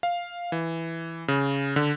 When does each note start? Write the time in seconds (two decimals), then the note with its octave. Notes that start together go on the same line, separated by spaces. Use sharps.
0.03 F5
0.52 E3
1.28 C#3
1.76 D3